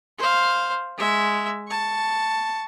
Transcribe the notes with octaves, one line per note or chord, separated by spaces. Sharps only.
C5 F5
G#3 E5
A5 C#6